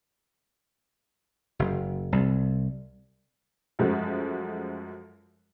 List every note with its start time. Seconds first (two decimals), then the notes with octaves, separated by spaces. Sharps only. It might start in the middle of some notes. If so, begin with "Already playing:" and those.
1.59 F#1
2.12 C2
3.79 F#2 F3 G#3 A3 F#4